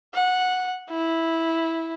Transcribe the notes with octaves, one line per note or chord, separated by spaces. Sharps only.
F#5
E4